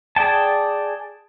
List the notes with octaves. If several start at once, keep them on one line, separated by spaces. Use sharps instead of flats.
G#4 D5 G5 A5